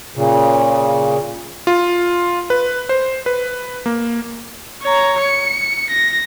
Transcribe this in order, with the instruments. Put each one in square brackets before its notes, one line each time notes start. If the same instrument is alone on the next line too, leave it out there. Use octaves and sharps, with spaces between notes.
[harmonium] A#2 C#3
[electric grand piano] F4
B4
C5
B4
A#3
[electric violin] C#5 A#5
C#7
A#6